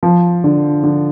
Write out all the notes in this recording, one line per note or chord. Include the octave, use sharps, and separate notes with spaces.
F3
D3
D3